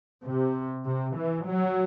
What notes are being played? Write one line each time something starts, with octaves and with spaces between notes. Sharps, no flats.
C3
C3
E3
F#3